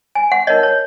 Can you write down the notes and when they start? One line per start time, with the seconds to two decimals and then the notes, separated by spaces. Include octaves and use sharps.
0.15 G#5
0.32 F#5
0.47 D#4 A#4 C#5 D#5
0.63 C#5